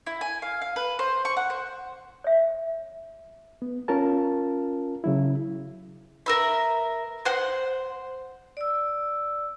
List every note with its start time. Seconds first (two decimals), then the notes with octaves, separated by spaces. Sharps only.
0.06 E4
0.21 G#5
0.42 F5
0.62 F5
0.76 B4
0.99 C5
1.25 C#6
1.37 F#5
1.50 C5
2.24 C#5 E5
3.62 B3
3.88 C#4 F4 A#4 A5
5.04 C#3 F#3 E4
6.26 A#4 E5 B5
7.25 C5 F#5 C6
8.57 D5 E6